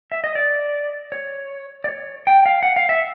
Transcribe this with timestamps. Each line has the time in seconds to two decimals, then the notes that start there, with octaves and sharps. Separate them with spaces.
0.12 E5
0.24 D#5
0.35 D5
1.12 C#5
1.84 D5
1.88 C#5
2.27 G5
2.46 F5
2.63 F#5
2.76 F5
2.89 E5